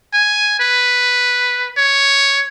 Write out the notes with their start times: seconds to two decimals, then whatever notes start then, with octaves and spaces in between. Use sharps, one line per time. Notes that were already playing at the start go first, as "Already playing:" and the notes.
0.14 G#5
0.60 B4
1.77 C#5